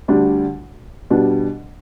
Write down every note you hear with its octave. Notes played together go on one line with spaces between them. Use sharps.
D2 D3 G3 D4
B2 G3 D4